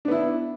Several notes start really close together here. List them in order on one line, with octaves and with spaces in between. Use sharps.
D4 B3 E4